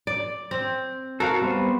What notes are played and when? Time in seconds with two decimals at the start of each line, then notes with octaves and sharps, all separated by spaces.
0.07 D5
0.51 C4
1.20 F#4 A4 A#4 F5
1.42 G3 B3 C5